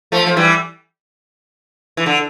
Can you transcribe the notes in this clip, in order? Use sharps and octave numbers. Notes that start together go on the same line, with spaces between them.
F3 A3
F3
E3 G3
E3
D3